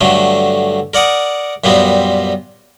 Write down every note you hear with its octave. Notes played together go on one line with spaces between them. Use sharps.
G2 D3 F#3 A3
A#4 D5 F#5 D#6
F#2 A#2 G3 B3 C4